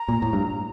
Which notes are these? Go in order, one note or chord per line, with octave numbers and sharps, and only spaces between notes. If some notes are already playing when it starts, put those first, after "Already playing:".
Already playing: A#5
A#2
A2
G2